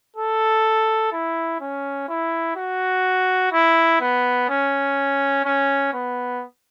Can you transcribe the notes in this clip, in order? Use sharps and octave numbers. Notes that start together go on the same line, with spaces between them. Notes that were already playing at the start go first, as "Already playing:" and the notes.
A4
E4
C#4
E4
F#4
E4
B3
C#4
C#4
B3